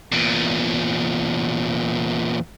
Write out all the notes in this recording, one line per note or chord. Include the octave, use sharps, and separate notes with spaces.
E2 A#2